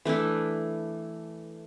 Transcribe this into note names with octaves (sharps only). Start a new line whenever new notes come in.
E3 A3 D4 E4